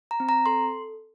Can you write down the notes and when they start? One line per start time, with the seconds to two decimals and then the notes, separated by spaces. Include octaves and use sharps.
0.11 A#5
0.20 C4
0.29 A#5
0.46 A4 C6